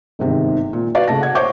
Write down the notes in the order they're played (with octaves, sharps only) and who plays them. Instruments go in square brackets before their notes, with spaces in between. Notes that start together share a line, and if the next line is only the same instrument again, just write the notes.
[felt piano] G1 G#2 C3 D#3
A#2
F#4 B4 D5 F5
C#3 A3 A5 A#6
F#5 G#6
C5 C#5 E5 C#6 D6 G6